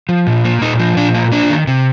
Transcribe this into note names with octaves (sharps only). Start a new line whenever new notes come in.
F3
A#2
A#3
A#2 D#4
F3
A#2 D4
A#3
A#3 D4
D#3
C3